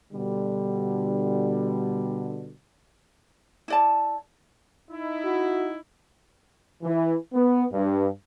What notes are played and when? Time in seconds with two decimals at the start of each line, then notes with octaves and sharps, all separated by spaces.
0.13 B2 D3 G3
3.68 E4 D5 A5
4.91 D#4 E4
5.25 F#4
6.83 E3
7.33 B3
7.72 G2